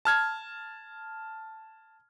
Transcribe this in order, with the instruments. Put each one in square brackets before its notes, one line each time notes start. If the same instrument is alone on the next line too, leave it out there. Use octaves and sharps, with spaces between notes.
[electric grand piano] A5 F6 G#6